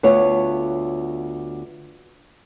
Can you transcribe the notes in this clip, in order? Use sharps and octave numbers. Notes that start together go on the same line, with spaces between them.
D2 B3 F4 C#5